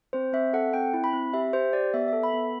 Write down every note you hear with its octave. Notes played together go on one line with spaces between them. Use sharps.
C4 C5
C4 E5
A4 F#5
C4 G5
E4
B5
C4
G4 E5
G4 C5
G4 D5
B3 E5
E5
A4
B5
B3